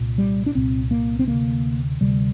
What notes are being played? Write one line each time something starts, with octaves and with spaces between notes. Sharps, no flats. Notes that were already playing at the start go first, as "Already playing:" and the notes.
Already playing: C2 A#2
G3
D4
C2 A#2 C4
A#3
C4
D2 C3 A#3
D2 C3 G3